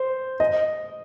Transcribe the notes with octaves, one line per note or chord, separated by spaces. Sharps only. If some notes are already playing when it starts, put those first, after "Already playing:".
Already playing: C5
D#5